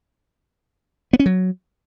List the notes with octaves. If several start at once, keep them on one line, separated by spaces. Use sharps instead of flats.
B3
C#4
F#3